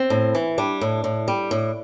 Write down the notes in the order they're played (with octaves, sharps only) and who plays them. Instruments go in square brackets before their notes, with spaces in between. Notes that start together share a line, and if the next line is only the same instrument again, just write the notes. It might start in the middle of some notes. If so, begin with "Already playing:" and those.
Already playing: [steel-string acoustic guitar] C4
A2
E3
G3 D4
A2
A2
G3
A2